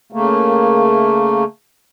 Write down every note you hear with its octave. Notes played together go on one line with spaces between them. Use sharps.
C#3 A3 A#3